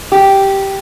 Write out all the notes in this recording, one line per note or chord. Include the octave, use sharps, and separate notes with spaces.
G4